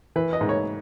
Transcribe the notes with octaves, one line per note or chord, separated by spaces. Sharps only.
E3 B4
D#5
G#2
C#5